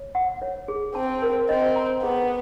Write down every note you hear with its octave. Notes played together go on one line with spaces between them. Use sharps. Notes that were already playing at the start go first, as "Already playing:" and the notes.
Already playing: C#5
F#5
C#5
G#4
C4 A5
A#4
C4 D#5
A#5
B3 G#4